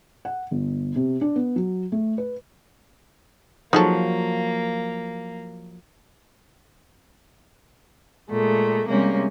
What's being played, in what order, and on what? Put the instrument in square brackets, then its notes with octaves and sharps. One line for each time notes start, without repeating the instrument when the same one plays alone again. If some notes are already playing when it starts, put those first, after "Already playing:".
[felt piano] F#5
G1
C3
D4
B3
F#3
A3
B4
[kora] F3 F#3 [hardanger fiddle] A#3 [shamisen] D#4 G#4 A4
[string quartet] A#2 G#3 A3
C3 G3 G#3 A#3 C#4